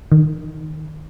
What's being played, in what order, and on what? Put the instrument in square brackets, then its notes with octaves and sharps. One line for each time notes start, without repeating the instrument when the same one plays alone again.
[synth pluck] D#3